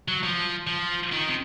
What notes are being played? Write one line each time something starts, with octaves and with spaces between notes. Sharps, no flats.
F#3
F3
F3
D#3
C3